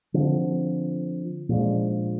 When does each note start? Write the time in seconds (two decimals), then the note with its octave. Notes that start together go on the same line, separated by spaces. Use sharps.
0.14 D3 F3 C4
1.49 A#2 F3 G#3 D4